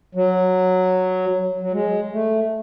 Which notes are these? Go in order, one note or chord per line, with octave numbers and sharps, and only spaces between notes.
F#3
F#3
G#3
A3